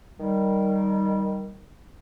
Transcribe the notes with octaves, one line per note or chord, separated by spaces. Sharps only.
D#3 G3